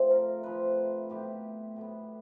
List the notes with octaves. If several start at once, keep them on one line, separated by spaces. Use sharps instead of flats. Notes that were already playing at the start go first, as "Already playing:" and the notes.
Already playing: C3 F3 A3
A#4
C3 F3 A3 B4
A2 F#3 B3 G4
A2 F#3 B3